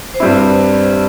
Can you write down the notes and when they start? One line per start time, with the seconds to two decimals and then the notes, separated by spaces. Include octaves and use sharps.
0.14 C5
0.20 G2 G3 C4 E4 D5
0.42 D5